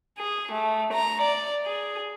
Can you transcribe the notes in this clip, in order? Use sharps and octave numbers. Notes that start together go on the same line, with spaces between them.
G#4
A3
A#5
D5
G#4